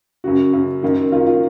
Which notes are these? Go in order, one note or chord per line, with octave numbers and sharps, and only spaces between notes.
F#2 C#3 F#4
F#2 C#3
F#2 D#3
F#2 D#3 F4
F4